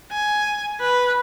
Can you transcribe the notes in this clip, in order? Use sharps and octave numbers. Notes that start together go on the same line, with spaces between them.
G#5
B4